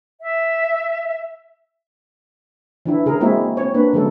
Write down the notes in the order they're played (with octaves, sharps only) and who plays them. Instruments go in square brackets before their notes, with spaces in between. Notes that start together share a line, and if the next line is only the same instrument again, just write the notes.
[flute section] E5
[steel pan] E3 D4 E4
C#3 G#4 A#4
G#3 A#3 C4 E4 F#4
C4 C#5
A#3 D4 B4
D3 F#3 G#3 C#4 A4